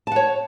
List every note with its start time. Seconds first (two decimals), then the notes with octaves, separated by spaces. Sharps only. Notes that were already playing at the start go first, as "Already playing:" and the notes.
0.07 A5
0.11 F#5
0.16 C#5